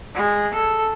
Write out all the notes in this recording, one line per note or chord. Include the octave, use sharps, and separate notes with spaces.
G#3
A4